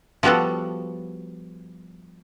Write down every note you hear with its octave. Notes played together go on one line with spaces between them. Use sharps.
F3 G3 B3 F#4 A4